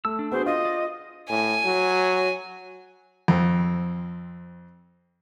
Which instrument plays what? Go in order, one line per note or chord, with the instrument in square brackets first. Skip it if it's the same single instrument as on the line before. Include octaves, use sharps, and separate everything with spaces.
[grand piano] A3 [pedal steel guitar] E6
[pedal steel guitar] D4
[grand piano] B3 F#4 G#4 [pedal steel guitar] D4 [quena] C5
[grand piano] F4 [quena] D#5
[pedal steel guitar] D5
[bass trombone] A2 [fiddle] G#5
[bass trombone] F#3
[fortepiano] F2 C4